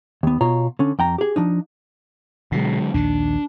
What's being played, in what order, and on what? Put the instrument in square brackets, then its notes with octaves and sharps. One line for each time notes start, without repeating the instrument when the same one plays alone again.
[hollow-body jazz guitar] D#2 B3
B2 F4 C#5 A#5
D3 C#4
F2 G5 A#5
G4 G#4
F3 D4 D#4
[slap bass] B2 [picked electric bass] D3 F#3 G#3
[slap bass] A#1 D#2 D#3 [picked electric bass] D4